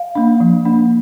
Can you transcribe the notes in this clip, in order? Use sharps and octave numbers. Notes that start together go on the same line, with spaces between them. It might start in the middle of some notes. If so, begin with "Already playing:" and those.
Already playing: F5
A#3 D4
F3
A#3 D4